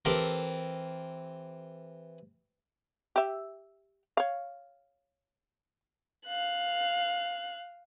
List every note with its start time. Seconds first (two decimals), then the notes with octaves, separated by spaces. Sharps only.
0.05 E3 C4 G4 A4 A#4
3.16 G4 E5
4.17 C#5 F5
6.27 F5 F#6